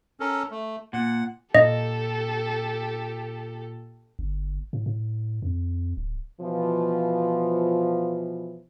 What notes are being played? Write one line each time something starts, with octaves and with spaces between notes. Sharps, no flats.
C#4 A4 A#4
A3
A#2 F#5
A#2 G4 A4 D#5
G1
A2
A2
F2
D1
B2 E3 F3